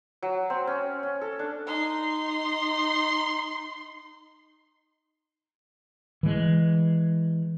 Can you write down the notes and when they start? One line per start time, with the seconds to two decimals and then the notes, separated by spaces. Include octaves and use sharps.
0.22 F#3
0.50 C4
0.67 C#4
1.03 C#4
1.21 A4
1.39 D4
1.66 D#4 C6
6.23 E3 G#3